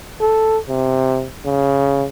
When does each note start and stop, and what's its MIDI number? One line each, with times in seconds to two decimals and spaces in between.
0.21 0.58 69
0.68 1.27 48
1.45 2.07 49